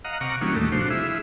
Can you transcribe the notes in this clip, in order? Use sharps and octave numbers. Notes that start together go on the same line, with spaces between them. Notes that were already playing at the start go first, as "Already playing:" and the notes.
D#5 F5 F#5 A#5
C3 F#5 A#5 C#6 D6 F6
E3 G3 A#3 C#4 D#4 F#4
D#2 A2 G3 A3
C3 F3 D4 F#4 C5
E4 F4 G#4 E5